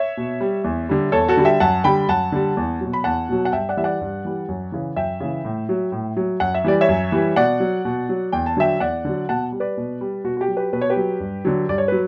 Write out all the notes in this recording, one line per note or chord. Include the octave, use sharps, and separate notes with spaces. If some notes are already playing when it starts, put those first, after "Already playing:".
Already playing: C#5 E5
B2
G3
E2
D3 G3
E2 A4 C#5
F#4 A4
D3 G3
E5 G5
F#2 F#5 A5
D3 G3 G5 B5
F#2 F#5 A5
D3 G3
E2
B2 F#3
B5
E2 F#5 A5
B2 F#3
F#5
G2 E5 G5
D5 F#5
E3 G3 E5
D5 F#5
G2
E3 G3
F#2
C#3 E3
F#2 E5 G5
C#3 E3
A2
F#3
A2
F#3
F#2 F#5
E5
E3 G3 D5
C#5 E5
F#2
E3 G3
B2 D5 F#5
F#3
B2
F#3
E2 G5
A5
D3 F#3 E5 G5
E2 D5 F#5
D3 F#3
B2 F#5 A5
G3
B4 D5
B2
G3
B2 F#4
F#4
G4
F#3
G4 B4
B2 B4
C#5
G4 B4
F#3
G2
D3 F#3
G2 D5
C#5
F#3 B4